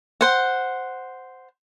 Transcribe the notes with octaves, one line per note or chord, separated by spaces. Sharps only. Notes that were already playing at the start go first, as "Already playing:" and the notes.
C5 F#5